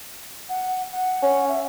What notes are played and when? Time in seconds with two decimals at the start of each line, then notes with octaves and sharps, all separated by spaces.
0.49 F#5
0.92 F#5
1.22 C#4
1.48 E5